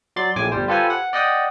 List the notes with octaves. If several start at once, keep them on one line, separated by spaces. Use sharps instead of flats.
F#3 D5 C6 A6
A#1 A2 G#5 D6
G1 G3 C5
F4 G4 A4 B4 C5 G#5
F#5
D5 D#5 F#5 G5 D#6